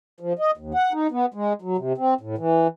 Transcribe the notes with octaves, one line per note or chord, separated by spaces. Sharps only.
F3
D#5
D#2
F#5
D#4
B3
G#3
F#3
C3
C4
A2
E3